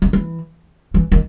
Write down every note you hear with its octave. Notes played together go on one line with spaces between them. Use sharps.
D#3
E3
E3
D#3